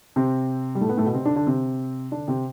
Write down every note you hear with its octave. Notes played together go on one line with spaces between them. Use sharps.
C3 C4
G3
A2 A3
B3
A2 A3
B2 B3
C3 C4
D3 D4
D3 D4
C3 C4
D3 D4
C3 C4